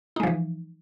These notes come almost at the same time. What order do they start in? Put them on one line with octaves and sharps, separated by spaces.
D#4 G#3 F3 E3